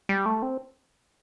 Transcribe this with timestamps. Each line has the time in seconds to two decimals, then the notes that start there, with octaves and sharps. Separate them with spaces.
0.09 G3
0.26 A3
0.42 C4